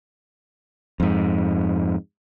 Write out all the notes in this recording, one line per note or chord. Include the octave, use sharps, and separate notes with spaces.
F2 G#2